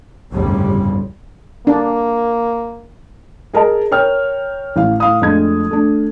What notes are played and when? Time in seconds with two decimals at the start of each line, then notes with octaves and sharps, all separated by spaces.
0.32 G1 C2 F2 A2 C#3 G3
1.67 A#3 D4
3.53 G#4 A#4 D#5 A5
3.91 A#4 C#5 G5 F6
4.76 A1 F5
5.00 A2 F5 D#6
5.22 F2 G#3 A3 D4 G#6
5.71 A3 D4